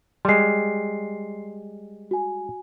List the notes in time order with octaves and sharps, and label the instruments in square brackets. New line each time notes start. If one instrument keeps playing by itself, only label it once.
[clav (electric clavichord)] G3 G#3 [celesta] C6 C7
[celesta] F#4 G#5